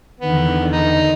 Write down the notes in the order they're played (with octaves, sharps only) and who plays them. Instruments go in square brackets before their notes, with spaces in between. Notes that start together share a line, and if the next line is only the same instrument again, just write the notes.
[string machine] E2 D3 D#3 [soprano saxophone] B3
[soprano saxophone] D#4